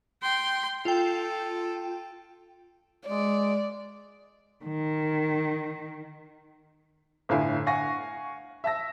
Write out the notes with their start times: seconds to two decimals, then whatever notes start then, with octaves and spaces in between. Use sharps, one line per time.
0.22 G5 C6
0.85 F4 A4 G5
3.07 G#3 D5
4.65 D#3
7.29 G1 A2 D3 E4 F5 G#5
7.66 F5 F#5 G#5 C#6 A#6
8.64 E5 A5 E6 A#6